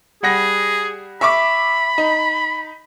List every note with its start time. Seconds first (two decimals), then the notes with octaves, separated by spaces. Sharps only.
0.23 G3 G#4 F#5 A#6
1.21 E5 B5 C#6 D6
1.98 D#4